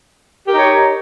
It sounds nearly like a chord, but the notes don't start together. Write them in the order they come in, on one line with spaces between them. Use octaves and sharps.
G4 A#4 D#4 C#5